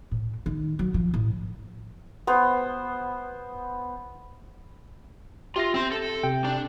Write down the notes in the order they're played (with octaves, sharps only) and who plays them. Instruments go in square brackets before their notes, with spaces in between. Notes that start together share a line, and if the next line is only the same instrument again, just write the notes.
[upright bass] A2
D#3
F#3
F3
A1
[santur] B3 C5
[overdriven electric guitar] F4 [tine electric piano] G4 E5 A#6
[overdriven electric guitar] C4 C6
A4
[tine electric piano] C3 G5
[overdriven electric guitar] D4